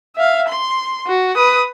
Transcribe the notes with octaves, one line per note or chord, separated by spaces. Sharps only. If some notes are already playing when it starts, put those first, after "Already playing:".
E5 F5
C6
F#4
B4 D#6